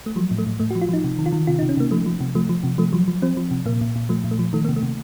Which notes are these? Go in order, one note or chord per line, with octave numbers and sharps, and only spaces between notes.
A3
F3 F#3
A2
A3
A2
A2 A3
F#4
F3
F4
F3 D#4
C3
D#3
F4
D#3
C3 F4
D#4
C3
C#4
C3 A#3
F3 A3
F3
C3
F3 A3
F3
C3
F3 A3
F3 F#3
F3
F3 C4
F3
C3
A#2 A#3
A#2
A#2
F3 A3
A#2
A3
F3
D#3 A3
C3 A#3
A3
C3